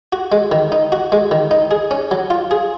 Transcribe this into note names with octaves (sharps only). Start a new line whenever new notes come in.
F#4
G#3
D#3
D#4
F#4
G#3
D#3
D#4
G#4
C#4
F#3
F4
G#4